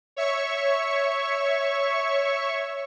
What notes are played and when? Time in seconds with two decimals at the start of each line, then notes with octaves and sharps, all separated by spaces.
0.16 C#5 E5 C#6